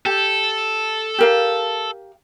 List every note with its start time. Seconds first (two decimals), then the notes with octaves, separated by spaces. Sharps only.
0.06 G4 A4
1.18 G4 A#4 F5